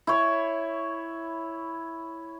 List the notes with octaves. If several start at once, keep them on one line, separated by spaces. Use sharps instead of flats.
E4 C#5